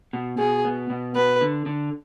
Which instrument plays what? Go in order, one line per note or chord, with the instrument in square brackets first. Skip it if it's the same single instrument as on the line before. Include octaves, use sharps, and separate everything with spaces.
[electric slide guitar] B2
[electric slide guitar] B2 [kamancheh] G#4
[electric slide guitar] B3
B2
[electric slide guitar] B3 [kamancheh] B4
[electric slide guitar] D3
D3